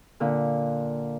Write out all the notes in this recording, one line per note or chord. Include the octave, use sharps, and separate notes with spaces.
A#2 D3